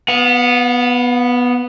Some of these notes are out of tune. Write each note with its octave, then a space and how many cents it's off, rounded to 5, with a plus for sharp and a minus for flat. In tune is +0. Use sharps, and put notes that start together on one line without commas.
B3 +0 F5 +45